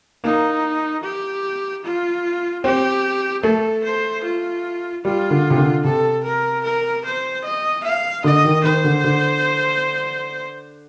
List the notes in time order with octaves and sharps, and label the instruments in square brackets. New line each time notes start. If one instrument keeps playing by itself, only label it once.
[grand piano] A#3 [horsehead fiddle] D#4
[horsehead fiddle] G4
F4
[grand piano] C4 [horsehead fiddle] G4
[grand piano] A3 [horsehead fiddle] A4
[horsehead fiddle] C5
F4
[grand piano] G3 [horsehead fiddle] F4
[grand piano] D3
C3
D3
[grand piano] C3 [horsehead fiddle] A4
[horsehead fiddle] A#4
A#4
C5
D#5
F5
[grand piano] D3 [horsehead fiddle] D#5
[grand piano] D#3
[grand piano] D#3 [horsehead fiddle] C5
[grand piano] D3
D3